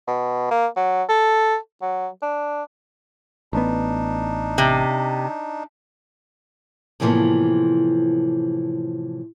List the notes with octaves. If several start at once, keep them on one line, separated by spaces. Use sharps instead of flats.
B2
A#3
F#3
A4
F#3
D4
A1 B3 D4 D#4
C3
A2 C3 E3 F3 A#3 B3